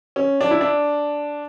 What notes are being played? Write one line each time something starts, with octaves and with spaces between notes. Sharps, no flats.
C#4
D4
E4
D4